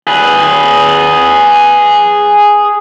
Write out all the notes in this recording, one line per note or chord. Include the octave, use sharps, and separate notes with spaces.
G#4 B4